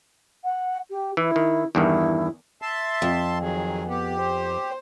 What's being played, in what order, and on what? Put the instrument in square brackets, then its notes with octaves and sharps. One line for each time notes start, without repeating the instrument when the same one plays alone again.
[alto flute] F#5
G4
[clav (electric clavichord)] E3 [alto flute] E4
[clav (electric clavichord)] D#3
[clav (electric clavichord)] E2 G2 D#3 [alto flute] E4
[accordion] E5 A5 C6
[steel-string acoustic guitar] F2
[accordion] D#3 F#3 [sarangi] G#4
[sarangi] B3 [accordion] G4
[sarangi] C5